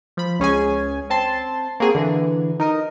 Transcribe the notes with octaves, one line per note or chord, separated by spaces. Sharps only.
F3 B5
C#2 C#4 G#4 G#5
C4 A5 C6
A#3 C4 F#4 G#4
D3 E3
D#4 A#4 D#5